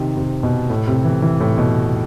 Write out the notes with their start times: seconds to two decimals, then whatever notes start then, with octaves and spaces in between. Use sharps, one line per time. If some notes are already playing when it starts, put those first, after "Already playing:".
Already playing: C3 D#3
0.17 C3
0.43 B2
0.70 A2
0.88 C3
1.05 E3
1.22 E3
1.40 A2
1.58 B2